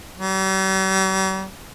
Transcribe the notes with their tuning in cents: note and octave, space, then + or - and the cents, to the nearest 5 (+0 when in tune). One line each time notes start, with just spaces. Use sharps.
G3 -45